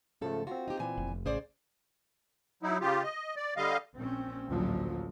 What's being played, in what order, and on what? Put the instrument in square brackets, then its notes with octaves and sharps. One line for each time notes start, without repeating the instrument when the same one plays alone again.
[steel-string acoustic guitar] G#2 A4 [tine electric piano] C#3 F3 A3
[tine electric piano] C4 F4 [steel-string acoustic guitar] F#4
[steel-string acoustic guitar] D#4 G4
A#2 E3 G#5
[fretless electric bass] F1
[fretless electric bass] A1 [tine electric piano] C#3 [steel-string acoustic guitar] G#4 C5 D5
[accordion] F#3 D#4 E4
C#3 F4 G4
D#5
D5
D3 G3 D#5 F5
[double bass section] A#1 C4 C#4
A1 D2 A#2 F3 F#3